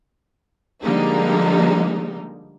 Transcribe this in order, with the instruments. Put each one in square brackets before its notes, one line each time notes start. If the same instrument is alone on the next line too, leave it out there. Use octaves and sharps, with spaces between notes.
[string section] D3 F3 G3 G#3 A#3 D#4